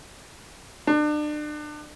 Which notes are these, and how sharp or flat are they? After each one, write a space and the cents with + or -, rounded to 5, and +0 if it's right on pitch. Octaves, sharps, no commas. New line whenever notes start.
D4 +35